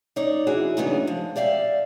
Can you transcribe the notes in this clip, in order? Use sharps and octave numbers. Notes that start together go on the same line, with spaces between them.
D#4 C#5 D5
E3 E4 F#4 G#4
E2 G2 C#3 F#3 B3 D#4
F3 G#3
G4 D5 E5 F5